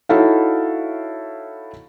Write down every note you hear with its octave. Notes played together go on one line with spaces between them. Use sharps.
D#4 E4 F#4 A4 C#5 F5